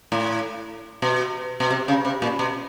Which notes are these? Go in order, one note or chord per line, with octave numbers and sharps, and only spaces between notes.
A2
B2
B2
C3
C#3
C3
A#2
B2